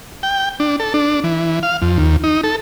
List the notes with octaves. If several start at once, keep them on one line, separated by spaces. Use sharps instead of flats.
G5
D4
A4
D4
E3
F5
F2
D#2
D#4
A4